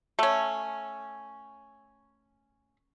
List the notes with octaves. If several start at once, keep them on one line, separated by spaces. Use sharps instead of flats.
A3 C#4